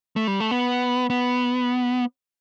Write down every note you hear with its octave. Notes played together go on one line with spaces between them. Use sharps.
A3
G3
A3
B3
B3